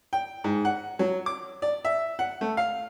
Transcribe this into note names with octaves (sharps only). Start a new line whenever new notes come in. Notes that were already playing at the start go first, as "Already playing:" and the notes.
G5
G#2
F#5
F#3
D6
D5
E5
F#5
A3
F5